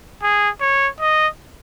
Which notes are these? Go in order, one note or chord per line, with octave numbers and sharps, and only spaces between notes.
G#4
C#5
D#5